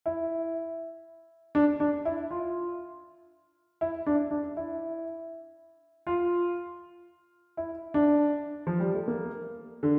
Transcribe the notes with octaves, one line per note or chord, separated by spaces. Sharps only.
E4
D4
D4
E4
F4
E4
D4
D4
E4
F4
E4
D4
F3
G3
A3
A#3
D3